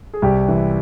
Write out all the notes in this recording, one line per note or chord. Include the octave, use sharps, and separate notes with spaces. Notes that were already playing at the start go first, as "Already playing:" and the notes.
G#4
C2 G4
E3